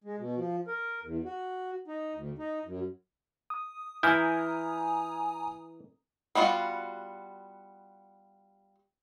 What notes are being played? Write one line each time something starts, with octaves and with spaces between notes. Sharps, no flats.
G#3
B2
F3
A#4
E2
F#4
D#4
D2
D#4
F#2
D#6
E3 E4 G#5 A#5 D#6 F6 G6
G3 B3 F4 F#4